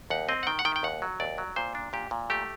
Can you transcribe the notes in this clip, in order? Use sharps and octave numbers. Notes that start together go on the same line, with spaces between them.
D#2 F#5
C4 D#5
F#5
D#3 G5
F#5
D#3 G5
G5
D#2 F#5
F#3
D#2 D5
F#3
A#2 C5
D4
A#2 G4
A#2
A3 G4